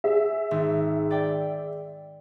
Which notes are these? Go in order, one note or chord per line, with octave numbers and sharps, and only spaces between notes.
G#4 E5
G#1
D5 G5